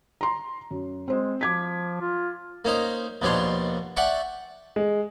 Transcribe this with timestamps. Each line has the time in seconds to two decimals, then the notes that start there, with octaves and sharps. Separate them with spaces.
0.21 A#5 C6
0.71 F#2
1.08 G#3 C4 C5
1.41 F3 D6 G#6 B6
2.00 F4
2.65 A#3 C#4 D#4 C5
3.22 D#2 B2 F3 D4 C#5 C6
3.96 D5 E5 F#5 G5 A5 C#6
4.76 G#3